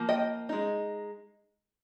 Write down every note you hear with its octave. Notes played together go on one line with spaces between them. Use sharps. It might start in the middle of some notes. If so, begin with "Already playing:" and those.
Already playing: F3 A#3
D#5 G5
G#3 D#4